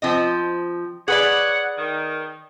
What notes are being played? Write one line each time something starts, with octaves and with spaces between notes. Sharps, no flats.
F3 C4 D#5
G#4 B4 C#5 D5 F#5
D#3